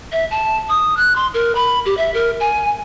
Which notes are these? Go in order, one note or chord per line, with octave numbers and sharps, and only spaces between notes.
E5
A5
D#6
F#6
C6
A#4
B5
G4
E5
A#4
G#5